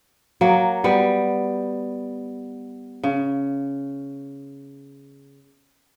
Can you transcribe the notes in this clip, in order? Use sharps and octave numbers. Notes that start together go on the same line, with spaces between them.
F#3 A#3
G3 B3
C#3